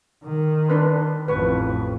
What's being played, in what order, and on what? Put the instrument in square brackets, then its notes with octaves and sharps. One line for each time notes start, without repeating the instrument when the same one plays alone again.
[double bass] D#3
[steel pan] D4 B4 C6
[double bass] A1 F2 [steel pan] B4 C#6